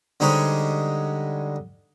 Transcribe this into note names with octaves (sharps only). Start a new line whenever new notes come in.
D3 G3 G#3 D#4 C5 C#5